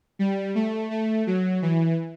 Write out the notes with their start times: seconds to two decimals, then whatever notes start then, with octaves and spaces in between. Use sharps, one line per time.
0.19 G3
0.55 A3
0.91 A3
1.27 F#3
1.62 E3